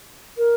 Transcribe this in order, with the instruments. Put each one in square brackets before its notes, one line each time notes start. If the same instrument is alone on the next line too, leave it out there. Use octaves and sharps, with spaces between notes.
[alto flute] A#4